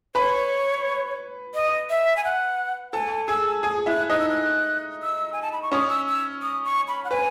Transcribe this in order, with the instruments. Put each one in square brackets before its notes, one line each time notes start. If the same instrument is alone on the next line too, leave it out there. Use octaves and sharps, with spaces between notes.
[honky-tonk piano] B4 B5 [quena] C#5
[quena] D#5
E5
G#5
F#5
[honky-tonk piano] A4 A5 [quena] G#5
[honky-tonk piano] G#4 G#5 [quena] E6
[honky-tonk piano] G#4 G#5 [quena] D#6
[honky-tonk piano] E4 E5 [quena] F#6
[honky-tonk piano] D#4 D#5 [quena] F#6
[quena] E6
F#6
E6
G#5
A5
B5
C#6
[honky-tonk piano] C#4 C#5 [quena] D#6
[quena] E6
E6
D#6
C#6
B5
F#5
[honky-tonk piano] B4 [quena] G#5